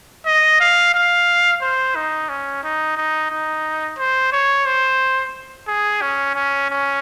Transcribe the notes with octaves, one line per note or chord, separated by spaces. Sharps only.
D#5
F5
F5
C5
D#4
C#4
D#4
D#4
D#4
C5
C#5
C5
G#4
C#4
C#4
C#4